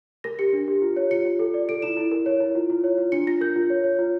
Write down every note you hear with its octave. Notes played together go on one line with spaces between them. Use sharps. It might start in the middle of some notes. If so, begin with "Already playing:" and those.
A#4 A#6
G4 C#7
D4
G4
F4
C#5
F4 C#7
F4
A4
D5
A4 D7
E4 E7
E4
A#4
C#5
E4
F4
F4
C#5
F4
D4 C#7
F4 A#6
A#4 G6
F4
C#5
C#5
F4